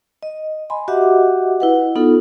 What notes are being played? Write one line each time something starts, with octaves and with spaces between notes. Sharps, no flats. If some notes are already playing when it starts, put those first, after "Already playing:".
D#5
D#5 G#5 B5 C6
F#4 G4 D#5 E5 F#5 D6
E4 B4 F#5
B3 D#4 F4 A4